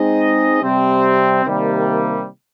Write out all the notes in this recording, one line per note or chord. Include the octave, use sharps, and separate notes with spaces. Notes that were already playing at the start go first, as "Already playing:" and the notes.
Already playing: G#3 C4 D#4 G#4 D#5
C3 G3 C4
C3 D#3 G3 A#3